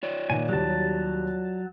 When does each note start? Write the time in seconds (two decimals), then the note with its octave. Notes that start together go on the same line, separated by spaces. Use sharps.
0.03 F4 C#5 D5
0.30 A#2 D#3 A#3 G#5
0.49 D#2 F#3 G3 A5